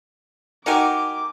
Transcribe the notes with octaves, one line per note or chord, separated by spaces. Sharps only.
D#4 F#4 G4 A#4 G#5 D6